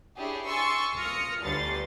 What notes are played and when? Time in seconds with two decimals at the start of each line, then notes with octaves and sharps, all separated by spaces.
0.18 D4 E4 G4 G#4 C#5
0.47 G#5 C6 C#6 E6 A6 C#7
0.98 F4 D#6 F6 A#6 C#7
1.43 G1 D2 G3 B4 C6 A6